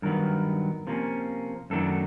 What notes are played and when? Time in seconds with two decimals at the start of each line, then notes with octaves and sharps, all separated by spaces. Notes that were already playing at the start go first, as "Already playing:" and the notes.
0.02 G2 D#3 F#3 B3 A#4
0.87 C3 F3 A#3 C#4
1.70 F#2 D#3 F#3 A3 D4 A4